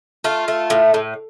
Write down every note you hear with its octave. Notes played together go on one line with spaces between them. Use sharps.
A3 F4
A3
A2
A2